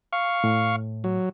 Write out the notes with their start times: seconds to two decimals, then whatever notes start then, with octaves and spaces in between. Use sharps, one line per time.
0.13 F5 C#6
0.44 A2
1.04 F#3